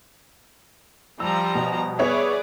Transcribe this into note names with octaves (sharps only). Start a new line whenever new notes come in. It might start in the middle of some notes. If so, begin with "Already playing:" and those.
F3 G3 A#5 E6
B2
B3 G#4 B4 C#5 D5 E5